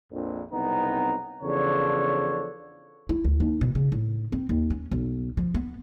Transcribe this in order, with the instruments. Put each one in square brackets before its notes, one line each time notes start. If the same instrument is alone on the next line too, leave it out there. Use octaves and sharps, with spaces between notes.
[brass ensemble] A#1 F2
F#1 C2 B3 C4 D#4 A#5
E2 C#3 F3 D4 A4 C#5
[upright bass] E4
D2
D#2
B2
C#3
A2
C4
D#2
C#4
B1
F3
B3